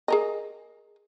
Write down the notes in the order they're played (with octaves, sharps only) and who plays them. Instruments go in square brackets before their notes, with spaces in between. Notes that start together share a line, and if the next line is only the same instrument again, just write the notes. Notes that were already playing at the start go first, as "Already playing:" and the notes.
[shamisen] G#4 A#4 D#5